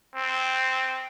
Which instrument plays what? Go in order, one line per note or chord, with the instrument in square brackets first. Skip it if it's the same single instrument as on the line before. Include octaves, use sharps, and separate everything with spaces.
[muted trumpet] C4